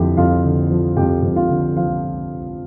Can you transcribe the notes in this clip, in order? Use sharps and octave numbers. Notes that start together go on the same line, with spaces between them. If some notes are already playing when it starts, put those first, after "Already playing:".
Already playing: F2 D3 F3 E4 G4 G5
F2 F4 F5
D3
F3
F2 G4 G5
F2
F4 F5
D3
F3 F4 F5